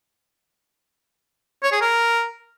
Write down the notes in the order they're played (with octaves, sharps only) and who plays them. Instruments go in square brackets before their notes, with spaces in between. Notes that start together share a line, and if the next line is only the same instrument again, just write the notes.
[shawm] C#5
G#4
A#4